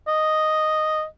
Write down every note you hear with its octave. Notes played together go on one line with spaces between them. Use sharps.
D#5